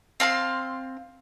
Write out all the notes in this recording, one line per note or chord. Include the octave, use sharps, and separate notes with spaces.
C4 F5 A5 C6